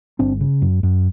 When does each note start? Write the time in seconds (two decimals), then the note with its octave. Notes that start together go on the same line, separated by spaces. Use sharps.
0.19 G1 C4 D4
0.41 C#3
0.62 F#2
0.83 F#2